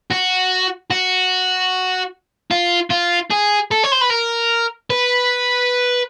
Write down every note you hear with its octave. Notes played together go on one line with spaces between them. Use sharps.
F#4
F#4
F4
F4
G#4
A4
C#5
C5
B4
A#4
B4